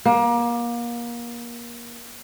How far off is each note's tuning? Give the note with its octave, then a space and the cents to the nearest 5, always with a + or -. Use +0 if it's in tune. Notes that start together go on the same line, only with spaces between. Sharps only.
A#3 +30